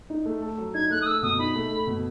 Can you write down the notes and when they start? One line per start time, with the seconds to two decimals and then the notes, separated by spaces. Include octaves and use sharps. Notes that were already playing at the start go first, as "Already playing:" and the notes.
0.10 D#4
0.26 A3
0.42 A4
0.58 F#3
0.74 D#4 G#6
0.90 A3 F#6
1.02 D#6
1.06 A4 E6
1.23 B2 D#6
1.39 D#4 B5
1.55 A3
1.72 A4
1.87 B2